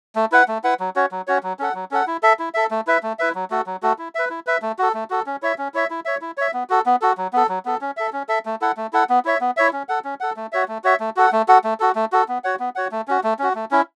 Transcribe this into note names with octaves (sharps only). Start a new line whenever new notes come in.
A3
E4 B4 F#5
A3
E4 B4 F#5
F#3
C#4 F#4 C#5
F#3
C#4 F#4 C#5
F#3
C#4 A4 F#5
F#3
C#4 A4 F#5
E4
A4 E5
E4
A4 E5
A3
E4 B4 E5
A3
E4 B4 E5
F#3
A3 F#4 A4
F#3
A3 F#4 A4
E4
B4 E5
E4
B4 E5
A3
F#4 A4
A3
F#4 A4
C#4
E4 C#5 E5
C#4
E4 C#5 E5
E4
C#5 E5
E4
C#5 E5
B3
F#4 A4
B3
F#4 A4
F#3
B3 A4
F#3
B3 A4
C#4
A4 E5
C#4
A4 E5
A3
E4 A4 F#5
A3
E4 A4 F#5
B3
E4 C#5 E5
B3
E4 C#5 E5
C#4
A4 F#5
C#4
A4 F#5
A3
F#4 C#5 E5
A3
F#4 C#5 E5
A3
F#4 A4 F#5
A3
F#4 A4 F#5
A3
F#4 A4
A3
F#4 A4
B3
F#4 C#5 F#5
B3
F#4 C#5 F#5
A3
C#4 F#4
A3
C#4 F#4
A3
C#4 E4